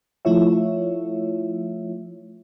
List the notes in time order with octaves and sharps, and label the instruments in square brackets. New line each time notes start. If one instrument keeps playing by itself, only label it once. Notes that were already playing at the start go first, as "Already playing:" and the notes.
[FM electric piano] F3 A3 E4 F4 C#5 E5